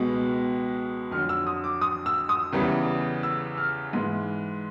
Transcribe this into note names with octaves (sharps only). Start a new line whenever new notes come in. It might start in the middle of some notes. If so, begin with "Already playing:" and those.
Already playing: C#2 B2 G#3 B3
F2 D3 F#3 F6
E6
D#6
D6
D#6
E6
D#6
E2 C#3 E3 G3
E6
F6
G#2 E3 G#3